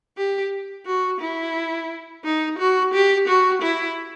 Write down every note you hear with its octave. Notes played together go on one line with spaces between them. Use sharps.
G4
F#4
E4
D#4
F#4
G4
F#4
E4